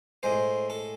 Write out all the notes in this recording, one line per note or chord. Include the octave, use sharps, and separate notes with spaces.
A2 G#3 C5
A4